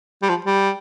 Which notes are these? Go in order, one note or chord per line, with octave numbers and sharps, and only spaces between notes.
G3
F3
G3